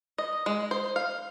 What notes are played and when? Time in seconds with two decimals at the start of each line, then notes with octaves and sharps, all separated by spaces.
0.18 D#5
0.46 G#3
0.71 C5
0.96 F5